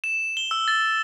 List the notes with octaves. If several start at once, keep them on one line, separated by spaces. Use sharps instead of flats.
E7
G7
E6
A6